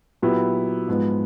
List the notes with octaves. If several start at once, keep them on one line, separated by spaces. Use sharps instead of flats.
A#2 F#3 B3 E4 G4
G#2 F3 G#3 B3